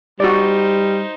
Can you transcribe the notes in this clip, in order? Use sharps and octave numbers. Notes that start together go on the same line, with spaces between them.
G3 D#4 F#4 C5 D5